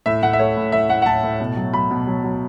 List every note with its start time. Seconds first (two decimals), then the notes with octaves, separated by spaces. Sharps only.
0.06 A2 E5
0.23 A2 F#5
0.33 E5
0.39 A3 C#5
0.57 A2
0.72 A2 E5
0.89 A2 F#5
1.02 F#5
1.06 A2 A5
1.23 A2
1.40 B2
1.56 F#3
1.73 F#3 B5
1.91 B2
2.07 F#3
2.24 F#3